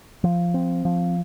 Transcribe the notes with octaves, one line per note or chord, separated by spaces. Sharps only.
F3
C4
F3